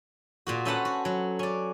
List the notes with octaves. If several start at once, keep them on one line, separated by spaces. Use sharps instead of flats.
A#2 A#3 F#4
C#4 A4 B4 C5 F#5 A5
F#4
F#3
C#4 D5